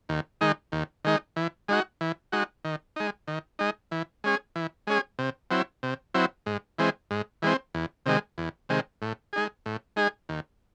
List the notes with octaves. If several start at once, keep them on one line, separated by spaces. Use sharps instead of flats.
D#2
D#3 G#3 D#4
D#2
D#3 G#3 D#4
E3
G#3 D#4 F#4
E3
G#3 D#4 F#4
D#3
G#3 D#4
D#3
G#3 D#4
E3
G#3 C#4 G#4
E3
G#3 C#4 G#4
C3
F#3 C4 E4
C3
F#3 C4 E4
G#2
E3 G#3 C4
G#2
E3 G#3 C4
E2
C3 D#3 G#3
E2
C3 D#3 G#3
A2
G#3 D#4 G#4
A2
G#3 D#4 G#4
D#2